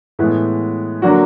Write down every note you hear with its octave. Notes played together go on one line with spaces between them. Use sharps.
A2 E3 G#3 B3
D3 F#3 A#3 D4 F#4